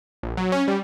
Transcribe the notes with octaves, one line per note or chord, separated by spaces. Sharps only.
A#1
F#3
C#4
G3